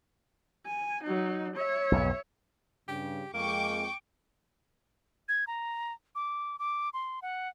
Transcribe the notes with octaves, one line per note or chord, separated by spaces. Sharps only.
G#5
F#3 D#4
C#5 E5
B1 F2 G#2
G2 C#3 G4
F2 G#3 A#3 G5 C#6 D6 D7
G#6
A#5
D6
D6
C6
F#5